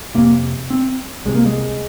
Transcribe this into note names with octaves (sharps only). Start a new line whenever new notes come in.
F2 C3 A#3
C4
C2 C3 G#3
A#3
G#3